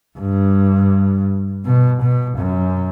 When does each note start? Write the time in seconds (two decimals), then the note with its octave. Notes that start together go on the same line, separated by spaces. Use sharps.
0.18 G2
1.65 B2
2.01 B2
2.38 F#2